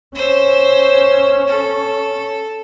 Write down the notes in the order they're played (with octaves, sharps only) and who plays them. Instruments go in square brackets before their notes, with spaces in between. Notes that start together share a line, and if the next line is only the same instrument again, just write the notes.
[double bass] C#4 [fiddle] C5 E6
[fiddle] A4